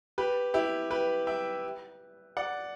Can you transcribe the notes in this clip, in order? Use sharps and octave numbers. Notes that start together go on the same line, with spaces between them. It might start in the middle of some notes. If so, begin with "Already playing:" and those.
G4 B4
E4 G4
G4 B4
E5 G5
D5 F#5